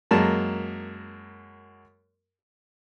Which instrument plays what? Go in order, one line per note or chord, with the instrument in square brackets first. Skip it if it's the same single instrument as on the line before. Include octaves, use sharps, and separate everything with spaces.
[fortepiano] F#2 G#3 A#3 A5